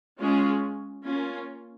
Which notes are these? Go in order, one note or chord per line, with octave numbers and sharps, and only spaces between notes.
G#3 C#4 F4 G#4
A#3 C#4 F4